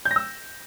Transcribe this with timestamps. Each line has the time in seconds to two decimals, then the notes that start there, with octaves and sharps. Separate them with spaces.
0.05 G6
0.11 A#6
0.16 E6